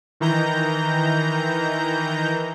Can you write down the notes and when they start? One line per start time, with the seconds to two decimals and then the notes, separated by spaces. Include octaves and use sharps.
0.20 D#3 E3 A#5 G6